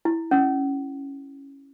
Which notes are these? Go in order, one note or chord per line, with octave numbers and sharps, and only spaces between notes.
E4
C#4